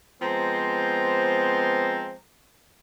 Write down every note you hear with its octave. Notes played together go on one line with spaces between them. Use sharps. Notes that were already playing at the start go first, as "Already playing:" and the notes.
F3 G#3 B3 C4 C5 A#5